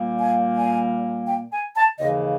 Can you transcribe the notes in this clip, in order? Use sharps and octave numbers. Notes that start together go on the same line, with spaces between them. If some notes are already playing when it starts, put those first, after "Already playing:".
Already playing: A#2 G3 A#3
G#5
G#5
G5
G#5
A5
D#2 C#3 E3 D#5